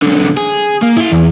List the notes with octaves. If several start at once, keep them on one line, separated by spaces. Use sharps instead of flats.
B1 D3
G#4
A#3
E4 C6
E2